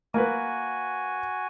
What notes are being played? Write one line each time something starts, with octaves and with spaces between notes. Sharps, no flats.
A#3 F#4 B4 G#5